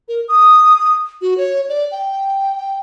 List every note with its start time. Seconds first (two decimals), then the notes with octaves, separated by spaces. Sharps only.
0.08 A#4
0.28 D#6
1.22 F#4
1.38 C#5
1.69 D5
1.92 G5